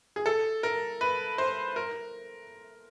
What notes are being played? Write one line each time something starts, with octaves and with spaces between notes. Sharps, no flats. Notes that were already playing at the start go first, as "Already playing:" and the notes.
G#4
A4
A#4
B4
C5
A#4